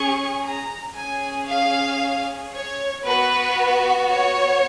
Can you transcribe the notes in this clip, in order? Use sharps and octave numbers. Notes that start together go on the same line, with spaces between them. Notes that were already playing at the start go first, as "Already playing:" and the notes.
Already playing: C#4 G#4 C#6
A#5
C#4 G#4 G#5
F5
C#5
B3 F#4 B4
C#5